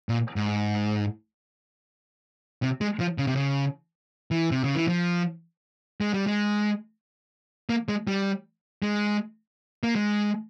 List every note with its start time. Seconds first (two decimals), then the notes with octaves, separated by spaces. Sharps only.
0.09 A#2
0.36 G#2
2.63 C3
2.81 G#3
3.00 F3
3.18 C#3
3.27 C3
3.36 C#3
4.31 E3
4.51 C3
4.64 C#3
4.75 E3
4.88 F3
6.01 G#3
6.14 G3
6.27 G#3
7.69 A#3
7.89 G#3
8.07 G3
8.83 G#3
9.83 A#3
9.95 G#3